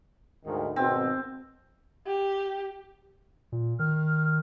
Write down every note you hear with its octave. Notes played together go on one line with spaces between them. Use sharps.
D2 G#2 D#3
G#1 B2 C4
G4
A#2
D#3 F6